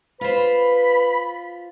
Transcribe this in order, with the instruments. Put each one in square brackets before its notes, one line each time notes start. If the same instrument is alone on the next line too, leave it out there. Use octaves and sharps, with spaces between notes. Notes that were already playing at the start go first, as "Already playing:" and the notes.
[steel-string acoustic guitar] F4 C5 [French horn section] B4 [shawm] B5